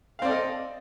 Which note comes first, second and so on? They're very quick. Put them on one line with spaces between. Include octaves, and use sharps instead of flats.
F5 C4 D5 A4 D#5